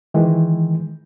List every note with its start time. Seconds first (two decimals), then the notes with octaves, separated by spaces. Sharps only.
0.14 D#3 E3 G#3